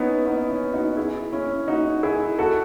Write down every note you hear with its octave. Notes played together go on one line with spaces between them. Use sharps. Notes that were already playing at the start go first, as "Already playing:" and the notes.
Already playing: B3 C#4 D#4 E4
B3 D#4
C#4 E4
D#4 F#4
E4 G#4
C#4 E4
D#4 F#4
E4 G#4
F#4 A4